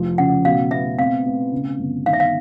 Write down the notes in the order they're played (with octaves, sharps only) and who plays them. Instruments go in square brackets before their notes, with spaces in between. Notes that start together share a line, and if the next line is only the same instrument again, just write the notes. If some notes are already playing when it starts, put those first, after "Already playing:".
Already playing: [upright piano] F1 F3
[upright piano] C#3 [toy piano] F#5
[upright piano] B2 [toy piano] F5
[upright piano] B3 [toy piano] E5
[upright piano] C4 [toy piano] F5
[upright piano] C4
C#3
G1
[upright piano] D#3 [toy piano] F5
[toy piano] E5
F5